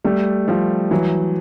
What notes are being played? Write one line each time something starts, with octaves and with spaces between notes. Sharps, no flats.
G3 A3
F3 G3
E3 F#3